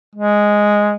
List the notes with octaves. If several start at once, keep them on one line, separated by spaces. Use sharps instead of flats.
G#3